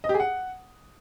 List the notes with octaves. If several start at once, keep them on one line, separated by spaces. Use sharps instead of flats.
D#5
G4
G#4
F#5